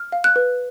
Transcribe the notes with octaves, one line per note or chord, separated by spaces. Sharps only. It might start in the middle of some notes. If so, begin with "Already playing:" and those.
Already playing: F6
F5
F#6
B4